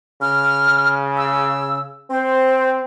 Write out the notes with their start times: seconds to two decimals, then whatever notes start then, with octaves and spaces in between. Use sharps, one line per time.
0.22 C#3 F6
1.17 E6
2.10 C4 C5